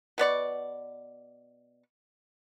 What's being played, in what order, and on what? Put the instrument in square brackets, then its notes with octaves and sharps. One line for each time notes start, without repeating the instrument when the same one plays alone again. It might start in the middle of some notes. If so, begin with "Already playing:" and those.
[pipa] B2 B3 D5 C#6